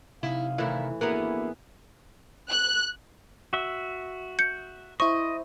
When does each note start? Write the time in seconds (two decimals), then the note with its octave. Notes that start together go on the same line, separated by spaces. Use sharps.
0.23 C3 D#4 E4 F5
0.58 A2 D#3 E3 E4
1.01 A#3 B3 D4 E4 F#4 G#4 A#4 F#5
2.49 F#6
3.53 F#4 E5
4.39 G6 C#7
5.00 E4 C5 D#5 C#6